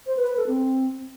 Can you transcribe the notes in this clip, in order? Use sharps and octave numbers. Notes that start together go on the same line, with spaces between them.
C5
B4
B4
A4
C4